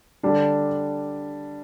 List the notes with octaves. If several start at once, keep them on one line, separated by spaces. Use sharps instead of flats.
D3 G3 D4